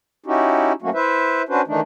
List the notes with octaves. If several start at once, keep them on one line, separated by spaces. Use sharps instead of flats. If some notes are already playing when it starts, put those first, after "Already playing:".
C#4 D#4 E4 F#4 G4
F#3 A3 A#3 C#4 F#4
E4 B4 C5 E5
C#4 D4 F#4 B4 C5
D#3 E3 A3 D4 D#4